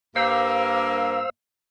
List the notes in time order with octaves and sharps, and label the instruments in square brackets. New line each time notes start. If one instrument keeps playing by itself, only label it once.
[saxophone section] G2 A#3 [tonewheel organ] C5 F5 E6